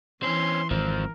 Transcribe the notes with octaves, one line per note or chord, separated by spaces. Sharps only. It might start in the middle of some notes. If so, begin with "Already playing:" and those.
E3 C4 C#4 C6
G#1 F3 C4 A#4